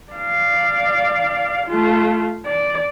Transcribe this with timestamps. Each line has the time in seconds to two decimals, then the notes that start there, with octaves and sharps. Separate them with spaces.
0.12 D5 F5
1.66 A3 F4
2.46 D5